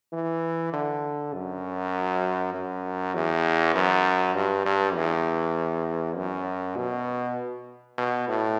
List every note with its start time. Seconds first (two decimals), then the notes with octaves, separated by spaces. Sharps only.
0.13 E3
0.73 D3
1.33 F#2
2.54 F#2
3.15 E2
3.75 F#2
4.35 G2
4.65 G2
4.95 E2
6.17 F#2
6.77 B2
7.98 B2
8.28 A2